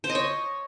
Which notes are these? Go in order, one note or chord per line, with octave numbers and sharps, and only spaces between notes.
C5
D#5
C#5